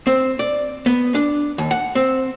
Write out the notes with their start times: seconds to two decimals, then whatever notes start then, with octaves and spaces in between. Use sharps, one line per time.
0.07 C4
0.39 D5
0.86 B3
1.15 D4
1.58 D#2
1.71 F#5
1.95 C4